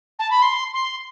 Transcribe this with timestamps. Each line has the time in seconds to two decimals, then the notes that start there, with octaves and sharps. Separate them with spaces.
0.19 A5
0.30 B5
0.42 C6
0.73 C6